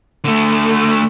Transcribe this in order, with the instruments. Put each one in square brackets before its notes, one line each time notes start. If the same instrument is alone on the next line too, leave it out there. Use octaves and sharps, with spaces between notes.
[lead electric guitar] D3 A3